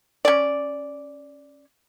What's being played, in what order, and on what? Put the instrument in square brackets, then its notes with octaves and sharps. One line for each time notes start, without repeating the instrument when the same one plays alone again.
[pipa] C#4 D5